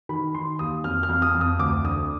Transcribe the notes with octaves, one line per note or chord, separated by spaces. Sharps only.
D#3 B5
D#3 C6
D#2 D#6
F2 F6
F6
F2
D#6
F2
D#6
D2 D6
D3 D#6